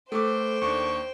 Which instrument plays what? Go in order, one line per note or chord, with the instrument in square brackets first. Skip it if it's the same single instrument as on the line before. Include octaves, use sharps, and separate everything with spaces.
[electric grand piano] A3 B4 [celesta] A4 D6 [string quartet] C5 G5
[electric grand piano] D#2 D4 [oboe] C#6